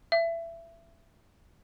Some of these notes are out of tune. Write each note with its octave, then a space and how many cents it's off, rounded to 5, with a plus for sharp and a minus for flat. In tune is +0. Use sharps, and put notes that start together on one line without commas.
E5 +25